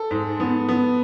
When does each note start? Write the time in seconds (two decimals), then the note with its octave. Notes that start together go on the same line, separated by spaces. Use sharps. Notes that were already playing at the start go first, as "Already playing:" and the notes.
Already playing: A4
0.11 G#2
0.40 B3
0.69 B3